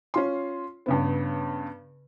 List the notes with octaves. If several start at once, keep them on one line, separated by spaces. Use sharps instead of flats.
C#4 F4 C6
G2 C#3 B3